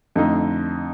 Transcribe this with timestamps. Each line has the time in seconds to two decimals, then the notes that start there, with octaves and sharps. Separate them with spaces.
0.16 F2 D3 A3 D#4